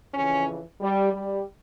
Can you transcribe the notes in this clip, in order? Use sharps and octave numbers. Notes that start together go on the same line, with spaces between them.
F2 C#3 E3 C#4
G3
G3